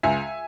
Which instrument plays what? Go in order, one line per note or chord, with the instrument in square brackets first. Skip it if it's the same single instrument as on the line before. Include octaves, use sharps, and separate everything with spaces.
[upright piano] C#2 E5 G#5